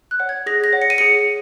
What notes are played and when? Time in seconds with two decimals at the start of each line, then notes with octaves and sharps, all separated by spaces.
0.11 F#6
0.20 C#5 F#5
0.29 G#6
0.46 G#4 A#6
0.64 A#6
0.73 C#5 F#5
0.82 C#7
0.90 D#7
0.98 G#4 C#7